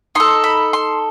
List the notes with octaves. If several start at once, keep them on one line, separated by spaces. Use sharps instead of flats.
D#4 A4 C6
B5
C6